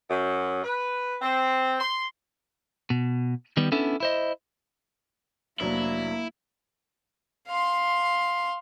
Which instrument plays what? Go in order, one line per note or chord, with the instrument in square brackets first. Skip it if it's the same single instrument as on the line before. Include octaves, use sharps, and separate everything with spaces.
[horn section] F#2
B4
C4
C6
[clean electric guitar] B2
D#3 G3 B3 G4
B3 C#4 D4 E4 A4
E4 C5 D#5
[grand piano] F1 F#3 D4 [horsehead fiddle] A#3 [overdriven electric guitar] E4
[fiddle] F5 C6